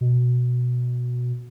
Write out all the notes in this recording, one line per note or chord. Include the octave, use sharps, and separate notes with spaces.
B2